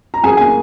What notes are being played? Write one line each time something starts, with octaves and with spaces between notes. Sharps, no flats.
A#5
F#2 G#4 G#5
A#3 G#5